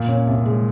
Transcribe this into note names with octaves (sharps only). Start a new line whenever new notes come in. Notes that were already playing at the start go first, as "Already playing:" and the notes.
Already playing: A#2
C#4
C2
G#3